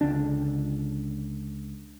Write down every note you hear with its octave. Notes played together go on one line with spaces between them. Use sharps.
C#2 D3 D4